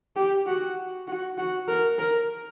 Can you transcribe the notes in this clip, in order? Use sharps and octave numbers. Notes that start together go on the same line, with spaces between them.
G4
F#4
F#4
F#4
A#4
A#4